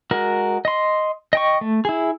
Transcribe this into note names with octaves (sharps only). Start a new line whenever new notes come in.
G#3 F#4 A#4
D#5 C6
D#5 G5 C#6
A3
E4 G#4